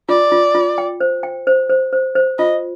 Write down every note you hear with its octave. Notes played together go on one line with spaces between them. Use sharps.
F4 D5
F4
F4
G5
C5
G5
C5
C5
C5
C5
F4 D#5